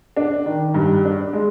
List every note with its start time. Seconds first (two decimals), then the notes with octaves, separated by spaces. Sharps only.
0.17 D4
0.46 D#3
0.74 G2
1.05 D4
1.33 G#3